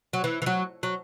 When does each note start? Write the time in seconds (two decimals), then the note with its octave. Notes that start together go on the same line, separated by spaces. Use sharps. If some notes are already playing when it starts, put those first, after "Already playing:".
0.13 F#3
0.24 E3
0.42 E3
0.46 F#3
0.83 F#3